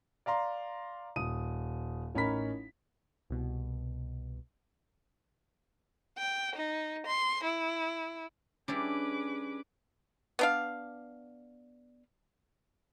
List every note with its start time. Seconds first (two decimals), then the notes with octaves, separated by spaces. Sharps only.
0.26 D5 F5 A#5 C6
1.16 D#1 D#6 D#7
2.15 A1 C#4 D#4 A#4 B5 B6
3.30 C2 B2
6.18 G5
6.55 D#4
7.07 C6
7.44 E4
8.68 G3 C#4 D4 E4 G#4 B4 D6
10.39 B3 D4 F5